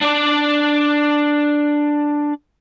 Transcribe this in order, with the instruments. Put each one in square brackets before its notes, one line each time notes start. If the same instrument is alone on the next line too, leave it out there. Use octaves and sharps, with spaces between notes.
[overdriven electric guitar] D4 D5